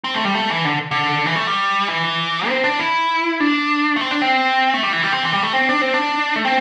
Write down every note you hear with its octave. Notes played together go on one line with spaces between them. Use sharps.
C4
A3
G3
A3
E3
D3
D3
E3
A3
G3
E3
C4
D4
E4
D4
A3
C4
D4
C4
A3
G3
E3
G3
C4
E3
G3
A3
C4
D4
C4
D4
A3
C4